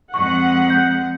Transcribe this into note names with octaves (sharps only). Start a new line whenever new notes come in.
F2 G#3 F#5 C#6
G6